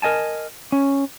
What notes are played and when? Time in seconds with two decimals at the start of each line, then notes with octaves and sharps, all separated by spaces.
0.02 A#4 D#5 G#5 A5
0.72 C#4